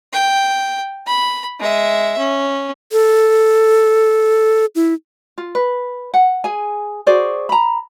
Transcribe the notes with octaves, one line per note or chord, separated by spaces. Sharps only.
G5
B5
G#3 E5
C#4
A4
E4
F4
B4
F#5
G#4 G#5
F#4 G#4 C5 D5
A#5 B5